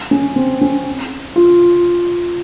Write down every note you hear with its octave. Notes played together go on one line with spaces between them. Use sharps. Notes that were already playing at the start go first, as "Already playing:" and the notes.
C#4
C4
C#4
F4